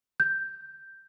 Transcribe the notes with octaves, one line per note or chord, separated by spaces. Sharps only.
G6